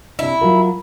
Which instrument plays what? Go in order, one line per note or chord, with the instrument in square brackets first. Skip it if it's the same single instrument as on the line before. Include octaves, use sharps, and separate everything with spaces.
[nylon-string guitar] C3 D4 [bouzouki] E4
[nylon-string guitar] F#3 F4 A#4